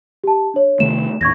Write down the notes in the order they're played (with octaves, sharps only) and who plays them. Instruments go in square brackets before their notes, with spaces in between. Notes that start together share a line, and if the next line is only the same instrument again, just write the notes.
[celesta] G4 A5
D4 C#5
[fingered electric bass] C3 D#3 A3 [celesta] E7
[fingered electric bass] D#2 A2 [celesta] C#6 G#6 A#6